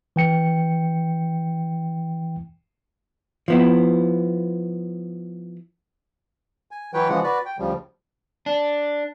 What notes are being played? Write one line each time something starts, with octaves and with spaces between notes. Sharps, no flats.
E3 G5 C#7
F3 B3 E4
G#5
E3 F#3 B4 C#5 G5
C#3 E3 F3 G#3 F#5
F#4 B4 D5
G5
D2 C#3 F3 G3
D4